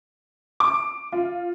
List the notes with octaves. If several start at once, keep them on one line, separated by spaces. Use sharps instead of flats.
D6
F4